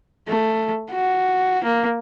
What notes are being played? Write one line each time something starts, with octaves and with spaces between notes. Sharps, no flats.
A3
F#4
A#3